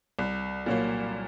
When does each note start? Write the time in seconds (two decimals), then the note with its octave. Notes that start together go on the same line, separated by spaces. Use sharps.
0.19 C2
0.66 A#2 F#3 A#3